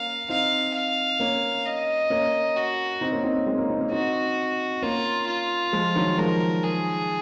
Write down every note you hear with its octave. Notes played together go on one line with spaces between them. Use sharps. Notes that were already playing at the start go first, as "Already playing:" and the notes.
Already playing: A#3 C#4 F5
C4 D#4 F5
F5
A#3 C#4
D#5
A#3 C#4
F#4
C4 D#4
A#3 C#4
C4 D#4
A#3 C#4
G#3 C4
A#3 C#4
C4 D#4
A#3 C#4
C4 D#4 F#4
A#3 C#4 F4
F4
F3 G#3
D#3 F#3
F3 G#3 A#4
G#4